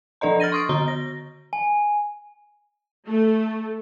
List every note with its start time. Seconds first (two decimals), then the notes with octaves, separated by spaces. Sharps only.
0.21 F3 D4 A4 D5 D#5 A#5
0.40 F6 A6 A#6 D#7
0.52 C6 C#6 D#6 A6 D7
0.69 D3 F#4 A#5 G7
0.88 A#6
1.53 G#5
3.07 A3